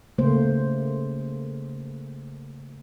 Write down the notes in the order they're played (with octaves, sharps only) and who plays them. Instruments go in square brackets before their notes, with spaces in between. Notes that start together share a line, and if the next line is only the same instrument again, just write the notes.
[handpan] C#3 A3 A#3 C5